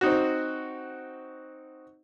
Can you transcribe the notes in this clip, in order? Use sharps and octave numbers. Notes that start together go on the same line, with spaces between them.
C4 D#4 F#4